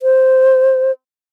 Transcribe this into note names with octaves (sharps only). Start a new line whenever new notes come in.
C5